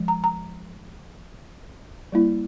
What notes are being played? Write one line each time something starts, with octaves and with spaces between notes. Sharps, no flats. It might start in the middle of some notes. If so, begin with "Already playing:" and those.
Already playing: F3 G#3
A#5
A#5
G3 A#3 E4